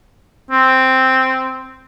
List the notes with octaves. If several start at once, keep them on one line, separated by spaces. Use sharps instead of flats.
C4